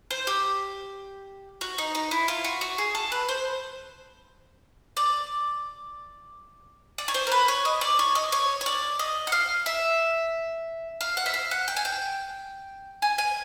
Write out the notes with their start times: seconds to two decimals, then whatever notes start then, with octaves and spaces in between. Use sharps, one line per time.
0.11 C5
0.27 G4
1.61 F#4
1.78 D#4
1.95 D#4
2.11 E4
2.28 F4
2.44 F#4
2.61 F#4
2.78 G#4
2.95 A4
3.12 B4
3.29 C5
4.97 D5
6.98 D5
7.08 C#5
7.14 C5
7.27 A#4
7.32 B4
7.48 C#5
7.65 D#5
7.81 D5
7.99 C#5
8.15 D#5
8.32 C#5
8.61 C#5
8.66 D5
8.99 D#5
9.27 F#5
9.32 F5
9.66 E5
11.01 F5
11.17 F#5
11.26 E5
11.34 F5
11.51 F#5
11.68 G5
11.77 G#5
11.85 G5
13.02 G#5
13.18 G#5